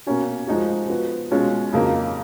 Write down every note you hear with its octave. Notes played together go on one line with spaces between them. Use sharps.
B2 A#3 C#4 F#4
F3 G#3 D#4 F#4
F3 B3 F#4
B2 G#3 C#4 F4
F2 C#3 F#3 A#3 D#4